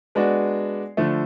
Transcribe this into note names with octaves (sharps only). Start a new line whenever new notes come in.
G#3 B3 D4 F#4
D3 F3 A3